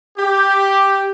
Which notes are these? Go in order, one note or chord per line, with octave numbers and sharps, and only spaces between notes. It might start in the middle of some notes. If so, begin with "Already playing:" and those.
G4